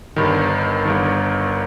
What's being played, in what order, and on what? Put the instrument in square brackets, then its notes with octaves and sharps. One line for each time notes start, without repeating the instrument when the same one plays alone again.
[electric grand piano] G1 G2 D#3
G1 G2 D#3